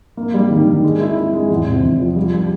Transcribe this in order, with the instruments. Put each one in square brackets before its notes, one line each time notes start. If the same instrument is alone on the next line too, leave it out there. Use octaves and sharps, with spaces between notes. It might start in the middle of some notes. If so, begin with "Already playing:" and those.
[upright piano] A#3
G3
D#3
D#3
G#3
E4
E4
G#3
E2
C3
E2
F3
G3
G3